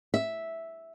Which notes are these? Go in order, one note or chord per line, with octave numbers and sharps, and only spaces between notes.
E5